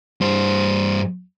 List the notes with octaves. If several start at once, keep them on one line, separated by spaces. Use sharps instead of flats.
G2 C5